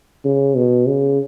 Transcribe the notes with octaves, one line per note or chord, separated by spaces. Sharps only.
C#3
B2
C#3